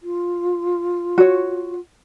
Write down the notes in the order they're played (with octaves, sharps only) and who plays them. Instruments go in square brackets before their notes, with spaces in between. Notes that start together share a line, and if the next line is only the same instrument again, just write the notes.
[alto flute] F4
[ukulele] F#4 C#5